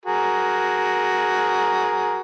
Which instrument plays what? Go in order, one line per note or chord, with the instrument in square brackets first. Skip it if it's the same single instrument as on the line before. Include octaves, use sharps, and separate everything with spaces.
[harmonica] F#4 G#4 A#4